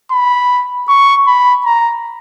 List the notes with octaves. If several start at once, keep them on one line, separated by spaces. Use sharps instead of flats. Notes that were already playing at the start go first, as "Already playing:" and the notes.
B5
C#6
B5
A#5